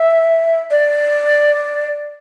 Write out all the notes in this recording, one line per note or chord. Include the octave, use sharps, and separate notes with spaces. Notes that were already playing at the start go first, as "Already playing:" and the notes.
Already playing: E5
D5